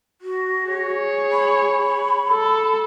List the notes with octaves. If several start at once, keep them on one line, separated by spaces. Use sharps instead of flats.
F#4
G#4 C#5
B5
A4